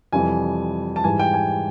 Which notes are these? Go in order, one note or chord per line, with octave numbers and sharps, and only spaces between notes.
F2 C3 E3 G3 G#5
A5
G#2 E3 G3 G#5
G5
G#5